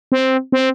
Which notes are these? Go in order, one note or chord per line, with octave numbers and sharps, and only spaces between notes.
C4
C4